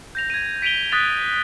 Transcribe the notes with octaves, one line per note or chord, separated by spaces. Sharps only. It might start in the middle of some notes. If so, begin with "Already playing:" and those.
G6 A#6 F7
G#6 D#7
B6 D7 D#7 F7 G7
D#6 F#6 A6 B6 F7